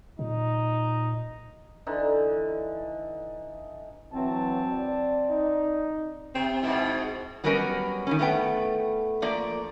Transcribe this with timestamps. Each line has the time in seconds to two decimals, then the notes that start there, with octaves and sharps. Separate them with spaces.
0.19 A#2 D#4
1.87 D3 E3 D#4
4.13 E3 F#3 C4 A5
4.73 D5
5.30 D#4
6.35 C3 C4
6.63 G#2 B2 E4
7.44 F#3 G3 B3 C#4 A#4 D#5
8.07 D#3 G3 C#4
8.19 A2 A3 B3 G4 G5
9.22 F3 A3 A#3 D5